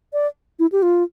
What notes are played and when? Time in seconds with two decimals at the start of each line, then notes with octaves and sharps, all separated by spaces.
0.13 D5
0.59 E4
0.72 G4
0.82 F4